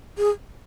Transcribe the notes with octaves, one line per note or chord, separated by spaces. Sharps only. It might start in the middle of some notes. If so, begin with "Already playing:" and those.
G#4